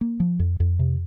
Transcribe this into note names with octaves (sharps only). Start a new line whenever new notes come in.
A#3
F3
F2
F2
C3